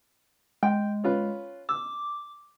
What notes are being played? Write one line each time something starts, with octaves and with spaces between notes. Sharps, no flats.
G#3 G5
C#4 F4 B4
D6 E6